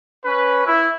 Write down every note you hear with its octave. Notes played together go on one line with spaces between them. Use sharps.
C#4 B4
E4